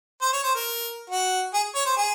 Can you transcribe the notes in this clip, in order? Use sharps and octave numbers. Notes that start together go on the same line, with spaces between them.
C5
C#5
C5
A#4
F#4
G#4
C#5
C5
G#4